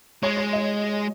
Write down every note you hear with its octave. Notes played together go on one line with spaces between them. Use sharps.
G#3 C#5
C#5
D#5